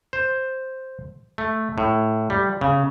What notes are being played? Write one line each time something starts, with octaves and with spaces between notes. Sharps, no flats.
C5
A3
A2
G3
C#3